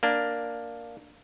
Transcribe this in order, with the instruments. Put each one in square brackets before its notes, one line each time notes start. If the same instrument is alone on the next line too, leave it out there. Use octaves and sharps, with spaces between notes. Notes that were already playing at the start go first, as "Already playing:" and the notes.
[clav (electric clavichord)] A#3 D4